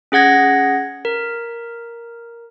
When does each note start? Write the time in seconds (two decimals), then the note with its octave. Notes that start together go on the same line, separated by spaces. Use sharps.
0.12 C#4 G#4 F#5 G#6 A#6
1.05 A#4